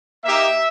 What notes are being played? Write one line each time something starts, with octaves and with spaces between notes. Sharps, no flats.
A#3 D#4 G4 E5